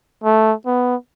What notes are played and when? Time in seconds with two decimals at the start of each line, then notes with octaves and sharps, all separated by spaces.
0.24 A3
0.66 B3